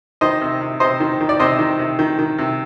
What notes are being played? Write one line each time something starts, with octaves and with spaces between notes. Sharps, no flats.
D#3 C5 D#5
C3
C3
C3 C5 D#5
D#3
D#3
D5
C3 C5 D#5
D#3
C3
D#3
D#3
C3